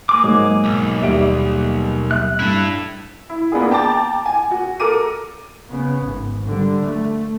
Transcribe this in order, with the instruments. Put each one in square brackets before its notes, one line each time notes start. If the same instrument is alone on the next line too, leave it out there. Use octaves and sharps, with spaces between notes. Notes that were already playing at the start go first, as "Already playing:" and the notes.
[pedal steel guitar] A#3 G#4 D6
[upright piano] G#2 [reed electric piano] F#3
[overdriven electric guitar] B1
[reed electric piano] D#2 G3 [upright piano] E5 D7
[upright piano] E5 [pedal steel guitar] F#6
[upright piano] G2 [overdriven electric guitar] E4 A4
[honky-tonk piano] E4
A#3 B3 D4 F4 G#4
G5 A5 A#5 D6 A6
G#5
F#4
A4 A#4 D6 D#7
[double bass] C#3 B3
G#1
D3 G3
A3